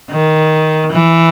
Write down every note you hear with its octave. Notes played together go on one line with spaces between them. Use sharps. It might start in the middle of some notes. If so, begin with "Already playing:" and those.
D#3
E3